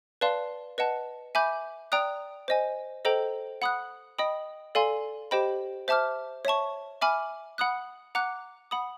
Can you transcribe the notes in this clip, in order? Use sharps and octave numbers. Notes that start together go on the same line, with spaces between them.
B4 D5 F5 A5 C6
B4 D#5 F#5 A5
E5 G#5 B5 D6 G6
D5 G5 A#5 D#6 F#6
C5 D#5 G#5
A4 C5 D#5 G5 A#5
F#5 B5 D#6 F#6
D#5 G5 B5 D#6
A4 D5 F5 G#5 C6
G4 C5 D#5 G5 B5
C5 E5 A5 D6 F6
C#5 E5 A5 C#6
E5 G#5 B5 D6 F6
F#5 B5 D#6 F#6
F#5 A#5 D6 F#6
F#5 B5 D#6